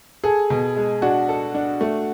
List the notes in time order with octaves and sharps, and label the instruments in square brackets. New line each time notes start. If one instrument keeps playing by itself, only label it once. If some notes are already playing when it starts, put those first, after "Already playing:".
[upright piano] G#4 [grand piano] A4
[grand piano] B2
G#3
[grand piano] D4 [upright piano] F#4
[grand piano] A4
D4
A3